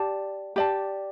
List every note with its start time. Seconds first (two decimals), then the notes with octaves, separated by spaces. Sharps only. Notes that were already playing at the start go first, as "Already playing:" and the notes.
Already playing: G4 D5 A5
0.56 G4 D5 A5